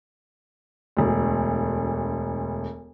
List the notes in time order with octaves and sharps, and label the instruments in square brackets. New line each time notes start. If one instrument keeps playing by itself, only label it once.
[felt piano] E1 D2